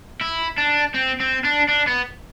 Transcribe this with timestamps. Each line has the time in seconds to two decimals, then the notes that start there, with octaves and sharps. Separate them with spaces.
0.21 E4
0.58 D4
0.95 C4
1.20 C4
1.44 D4
1.69 D4
1.87 B3